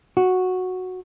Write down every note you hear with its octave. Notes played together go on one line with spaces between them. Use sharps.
F#4